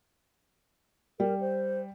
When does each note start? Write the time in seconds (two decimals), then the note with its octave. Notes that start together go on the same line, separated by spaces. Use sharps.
1.20 G3 A#4
1.41 C5